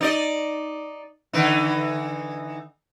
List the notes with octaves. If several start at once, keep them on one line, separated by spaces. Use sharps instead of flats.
D#4 D5 D#5
D3 E3 D#4